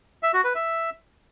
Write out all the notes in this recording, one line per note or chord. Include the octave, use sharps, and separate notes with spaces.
E5
F#4
B4
E5